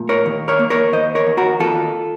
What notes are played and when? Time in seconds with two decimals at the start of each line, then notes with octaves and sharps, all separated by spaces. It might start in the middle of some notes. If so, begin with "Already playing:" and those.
Already playing: A#2 A3
0.09 A#4 C#5
0.26 D#2
0.48 A#4 C#5
0.59 A#3
0.70 A#4 C#5
0.92 D#2 C5 D#5
1.15 A#4 C#5
1.27 D#2
1.37 F#4 A#4
1.60 D#2 F4 A4